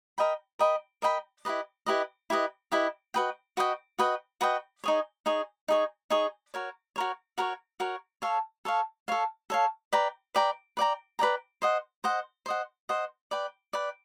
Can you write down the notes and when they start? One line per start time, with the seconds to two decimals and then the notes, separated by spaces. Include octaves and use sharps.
0.18 A#4 D#5 G5 B5
0.59 A#4 D#5 G5 B5
1.02 A#4 D#5 G5 B5
1.45 E4 G4 B4 D#5
1.86 E4 G4 B4 D#5
2.30 E4 G4 B4 D#5
2.72 E4 G4 B4 D#5
3.14 F#4 B4 D#5 G5
3.57 F#4 B4 D#5 G5
3.99 F#4 B4 D#5 G5
4.41 F#4 B4 D#5 G5
4.84 D#4 G#4 C#5
5.26 D#4 G#4 C#5
5.68 D#4 G#4 C#5
6.10 D#4 G#4 C#5
6.54 F#4 A#4 C#5
6.96 F#4 A#4 C#5
7.38 F#4 A#4 C#5
7.80 F#4 A#4 C#5
8.22 A4 C#5 F5
8.65 A4 C#5 F5
9.08 A4 C#5 F5
9.50 A4 C#5 F5
9.93 B4 D5 G5 A#5
10.35 B4 D5 G5 A#5
10.77 B4 D5 G5 A#5
11.19 B4 D5 G5 A#5
11.62 C5 D#5 F#5
12.04 C5 D#5 F#5
12.46 C5 D#5 F#5
12.89 C5 D#5 F#5
13.31 B4 D5 G5
13.73 B4 D5 G5